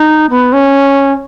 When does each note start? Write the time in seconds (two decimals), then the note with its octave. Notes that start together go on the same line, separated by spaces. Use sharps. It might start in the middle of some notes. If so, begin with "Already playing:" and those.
Already playing: D#4
0.30 B3
0.53 C#4